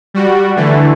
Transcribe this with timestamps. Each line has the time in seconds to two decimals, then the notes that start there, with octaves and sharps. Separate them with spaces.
0.14 G3 F#4
0.56 D3 E3 A3